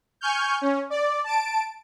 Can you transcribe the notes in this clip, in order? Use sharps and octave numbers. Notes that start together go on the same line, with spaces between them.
G#5 C#6 F6 G6
C#4
D5
A5 D7